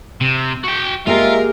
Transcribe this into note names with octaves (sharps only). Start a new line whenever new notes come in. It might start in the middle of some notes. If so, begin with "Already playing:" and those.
C3
F#4 G5
G#3 A#3 F4 G4 G#4 A#4 E5